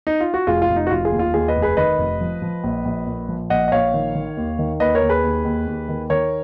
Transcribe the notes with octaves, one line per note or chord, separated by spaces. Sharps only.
D#4
F4
F#4
F1 F4 G#4
F4
F1
D#4
F#4
F1 F4
F4 G#4
D#2
F4
D#2 F4 G#4
B4 D#5
F1
G#4 B4
D#3 B4 D#5
F1
F3
F3
A#1
A#1
A#2
F3
A#1 D#5 F#5
D#5
A#1 C#5 F5
D#3
D#3
D#2
D#3
D#2 B4 D#5
A#4 C#5
D#2
G#4 B4
D#2
D#2
D#2
D#3
D#3 A#4 C#5